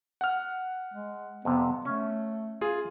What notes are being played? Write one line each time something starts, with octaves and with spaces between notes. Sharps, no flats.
F#5 F6
G#3
F2 C3 B3
A3 C#4
F4 G#4